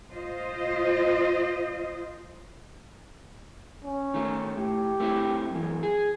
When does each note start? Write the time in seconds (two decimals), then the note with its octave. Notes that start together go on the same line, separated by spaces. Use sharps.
0.11 F4 C5 D#5
3.85 C#4
4.14 D#3 A3
4.57 A2 G4
5.00 A3 C4 E4
5.51 F#2 E3
5.83 G#4